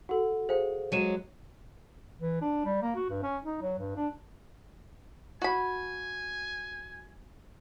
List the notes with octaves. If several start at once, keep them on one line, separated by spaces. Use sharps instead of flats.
F#4 A4 F#5
G#4 C5 F5 G5
F#3 G#3 C#5 D#7 E7
E3
D4
G3
A#3
F#4
G2
C#4
D#4
F#3
G2
D4
F#4 G#5 B5